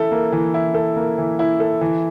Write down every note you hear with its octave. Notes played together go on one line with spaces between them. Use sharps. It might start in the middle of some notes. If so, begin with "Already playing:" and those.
Already playing: E3 E4 A4
A#3
E3
E4
A4
A#3
E3
E4
A4
E3